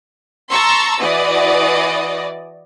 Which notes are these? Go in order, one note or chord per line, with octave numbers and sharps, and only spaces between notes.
A5 A#5 C6 C#6 E6
E3 F#4 D5 D#5